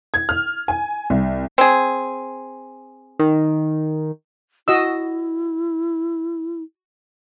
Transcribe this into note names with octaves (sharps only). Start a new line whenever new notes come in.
G#6
F6
G#5
C2
C4 G#4
D#3
E4 F#4 D#5 E6